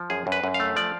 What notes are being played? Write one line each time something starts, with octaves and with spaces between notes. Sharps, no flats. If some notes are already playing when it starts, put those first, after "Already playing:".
Already playing: F3
F#2 G#4
F#2
B4
F#2
F5
A3
F3 D5